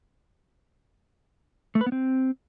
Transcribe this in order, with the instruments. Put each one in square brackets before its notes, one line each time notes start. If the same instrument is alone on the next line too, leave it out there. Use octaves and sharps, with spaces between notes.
[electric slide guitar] A3
B4
B3
C4